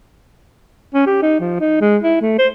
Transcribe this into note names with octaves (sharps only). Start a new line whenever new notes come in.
C#4
G4
D#4
F3
D#4
G#3
E4
A3
C5